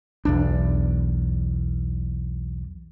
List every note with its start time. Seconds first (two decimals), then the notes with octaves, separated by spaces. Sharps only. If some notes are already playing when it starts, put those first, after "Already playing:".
0.25 B1 E2 D4